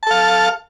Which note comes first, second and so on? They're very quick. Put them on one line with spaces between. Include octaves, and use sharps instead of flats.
A5 A4 F5